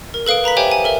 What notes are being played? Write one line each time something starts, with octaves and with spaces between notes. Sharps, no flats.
A#4
A4 B4 F5 D#6 D7
B4 A#5 B5 B6
G4 C5 C#5 E5 G5 G#5
G#5
A4 A#4 E5